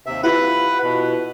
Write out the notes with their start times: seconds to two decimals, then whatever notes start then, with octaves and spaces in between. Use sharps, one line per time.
0.06 D#2 C3 E5
0.23 E4 F4 G4 B4 F#5
0.83 B2